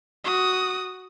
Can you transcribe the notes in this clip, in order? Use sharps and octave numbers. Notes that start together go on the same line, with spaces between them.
F#4 D#6